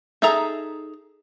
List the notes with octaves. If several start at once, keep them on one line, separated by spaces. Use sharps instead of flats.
D#4 G#4 A4 E5 A#5